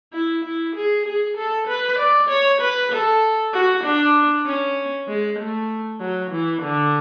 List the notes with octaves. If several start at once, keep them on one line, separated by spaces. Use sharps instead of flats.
E4
E4
G#4
G#4
A4
B4
D5
C#5
B4
A4
F#4
D4
C#4
G#3
A3
F#3
E3
D3